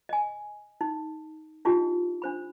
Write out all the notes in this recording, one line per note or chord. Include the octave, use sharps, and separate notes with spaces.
D#5 G#5
D#4
D4 D#4 F4 G4 D#5
D4 C5 B5